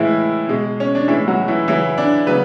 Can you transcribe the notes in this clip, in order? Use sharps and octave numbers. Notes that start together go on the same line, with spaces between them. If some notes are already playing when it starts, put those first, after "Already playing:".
Already playing: A2 E3 G#3 E4
B2 G#3
C#4
D4
A2 E3 G#3 E4
F#3 F#4
E3 E4
C#3 E3 F#3 E4
D4 D5
C#3 F#3 B3 B4